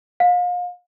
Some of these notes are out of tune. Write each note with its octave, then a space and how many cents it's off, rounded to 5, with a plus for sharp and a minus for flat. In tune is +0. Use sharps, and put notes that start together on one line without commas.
F5 +35